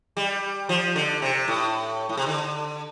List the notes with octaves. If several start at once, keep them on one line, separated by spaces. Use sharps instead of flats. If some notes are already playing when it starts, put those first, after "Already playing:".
G3
F3
D3
C3
A2
A2
C3
D3